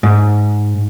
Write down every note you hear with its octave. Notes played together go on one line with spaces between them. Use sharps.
G#2